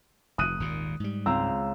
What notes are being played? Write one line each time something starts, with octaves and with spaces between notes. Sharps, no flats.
F1 D#6 F#6 D#7
G#1 D#2 A#2
G#2 G3
C#2 C4 A#5 E6